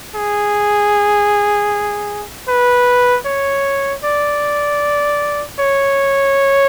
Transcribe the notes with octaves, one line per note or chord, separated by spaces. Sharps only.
G#4
B4
C#5
D5
C#5